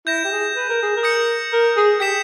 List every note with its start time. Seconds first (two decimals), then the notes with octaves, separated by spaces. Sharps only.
0.07 E4 G6 A#6 E7
0.24 G4
0.32 G#4
0.55 B4
0.69 A#4
0.82 G#4
0.96 A#4
1.03 D#6 G6 A#6 C#7
1.52 A#4
1.77 G#4
2.00 G4 G6 B6 E7